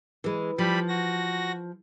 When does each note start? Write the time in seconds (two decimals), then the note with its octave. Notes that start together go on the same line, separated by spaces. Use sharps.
0.24 E3 G#3
0.58 F3 G3 B5
0.88 F#4 A#6